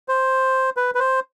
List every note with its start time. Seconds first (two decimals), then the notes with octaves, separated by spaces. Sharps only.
0.08 C5
0.77 B4
0.95 B4
0.99 C5